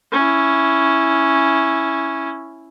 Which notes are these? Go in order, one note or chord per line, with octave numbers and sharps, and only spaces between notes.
C#4 E4